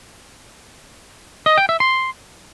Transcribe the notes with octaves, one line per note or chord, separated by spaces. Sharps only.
D#5
G5
E5
C6